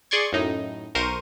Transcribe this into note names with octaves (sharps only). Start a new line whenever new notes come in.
G#4 D5 C6 C#6 G#6
F#2 A2 D#4
B1 A#4 C5 C#6 D#7